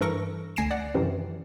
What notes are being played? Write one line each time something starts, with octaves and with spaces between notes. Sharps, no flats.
G2 E3 A4 A#4 C#6 A#6
D2 G#5 A#6 C7 D7 E7
D5 F#5
F#2 C3 D#3 E3